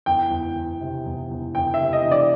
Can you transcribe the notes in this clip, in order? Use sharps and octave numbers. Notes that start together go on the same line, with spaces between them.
E2 G5
E2
E2
C3
E2
E2
E2 G5
E5
C3
D#5
E3
D5